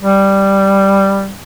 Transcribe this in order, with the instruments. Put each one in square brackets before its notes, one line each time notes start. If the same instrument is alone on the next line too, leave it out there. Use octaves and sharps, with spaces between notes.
[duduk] G3